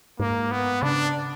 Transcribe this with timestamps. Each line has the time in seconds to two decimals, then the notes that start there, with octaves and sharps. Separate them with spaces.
0.20 G#2 A#3
0.51 B3
0.82 C#3 D4